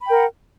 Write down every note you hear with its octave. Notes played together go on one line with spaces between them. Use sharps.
A#4 F#5 G5 B5